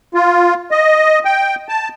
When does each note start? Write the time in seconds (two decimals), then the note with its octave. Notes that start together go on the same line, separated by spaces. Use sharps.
0.14 F4
0.71 D#5
1.25 G5
1.69 A5